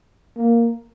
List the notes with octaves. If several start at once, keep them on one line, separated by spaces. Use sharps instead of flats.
A#3